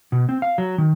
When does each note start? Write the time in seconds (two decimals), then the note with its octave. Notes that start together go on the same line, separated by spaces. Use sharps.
0.12 B2
0.29 C4
0.42 F5
0.58 F#3
0.78 D#3